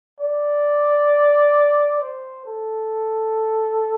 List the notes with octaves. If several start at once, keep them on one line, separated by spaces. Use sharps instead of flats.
D5
C5
A4